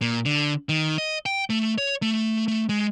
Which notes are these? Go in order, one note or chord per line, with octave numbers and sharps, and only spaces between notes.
A#2
D3
D#3
D#5
G5
A3
C#5
A3
A3
G#3